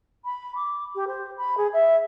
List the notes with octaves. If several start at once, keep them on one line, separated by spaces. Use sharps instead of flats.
B5
D6
G4
C5
B5
G#4
E5